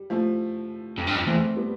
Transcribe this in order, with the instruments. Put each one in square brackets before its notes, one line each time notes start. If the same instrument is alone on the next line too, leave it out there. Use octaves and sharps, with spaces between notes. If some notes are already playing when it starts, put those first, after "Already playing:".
Already playing: [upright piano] G3
F3 A3
[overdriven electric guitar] F2
G2
F2
[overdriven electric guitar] E2 [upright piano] A3 C4
[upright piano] G3 B3